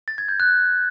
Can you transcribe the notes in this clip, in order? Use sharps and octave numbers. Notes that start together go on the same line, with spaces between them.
A6
G#6
G6
F#6